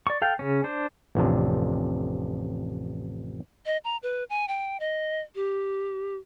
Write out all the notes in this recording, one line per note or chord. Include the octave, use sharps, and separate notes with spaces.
D5 C#6
A4 F5 G5
C#3 C#4
D4 C5
A1 F2 C3 D4
D#5
A#5
B4
G#5
G5
D#5
G4